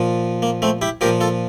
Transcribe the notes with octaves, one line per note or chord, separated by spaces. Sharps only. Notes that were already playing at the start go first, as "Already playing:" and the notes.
Already playing: A#2 F3
A#3
A3 C4
E4 G4
A#2 F3 G4 A#4
F4 A4